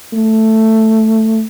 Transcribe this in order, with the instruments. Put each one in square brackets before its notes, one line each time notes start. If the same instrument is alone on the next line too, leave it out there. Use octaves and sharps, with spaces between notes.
[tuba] A3